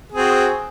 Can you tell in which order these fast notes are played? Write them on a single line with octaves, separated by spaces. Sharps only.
G#4 C4 F#4